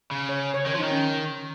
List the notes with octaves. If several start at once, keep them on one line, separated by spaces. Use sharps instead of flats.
C#3
C#5
C#5
D#3 C#5
F3
D#4
D#3
C#4